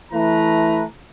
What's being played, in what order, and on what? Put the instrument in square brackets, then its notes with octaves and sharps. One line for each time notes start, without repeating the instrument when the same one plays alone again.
[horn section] E3 A3 E4 B4 A#5